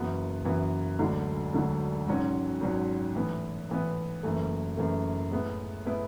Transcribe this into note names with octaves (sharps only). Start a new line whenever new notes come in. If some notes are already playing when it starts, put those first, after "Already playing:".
Already playing: F#1 F#2 E3 B3 F#4
F#1 F#2 E3 B3 F#4
E1 D2 D3 F#3
E1 D2 D3 F#3
G#1 G#2 F#3 C#4 F#4
G#1 G#2 F#3 C#4 F#4
A2 E3 B3
A2 E3 B3
F#1 F#2 E3 A3
F#1 F#2 E3 A3
A2 G#3 B3 E4 B4
A2 G#3 B3 E4 B4